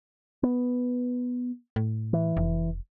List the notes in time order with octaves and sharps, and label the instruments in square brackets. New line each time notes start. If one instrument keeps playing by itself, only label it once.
[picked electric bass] B3
[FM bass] A2
[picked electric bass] E3
[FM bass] F1